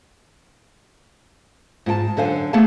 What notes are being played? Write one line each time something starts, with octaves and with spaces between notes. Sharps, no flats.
G#2 F4 G5 A5
F#2 D3 A4 C5 F5 G#5
A3 B3 E4 G#4 F5 A5